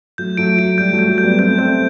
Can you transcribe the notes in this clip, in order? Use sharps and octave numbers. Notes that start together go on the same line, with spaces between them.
F#3 A3 G6
F#3 A3 D7
F#3 A3 D7
G3 G6
F#3 A3
G6
F#3 A3
G6
G3 B3
A3 C4 G6
A3 C4 G6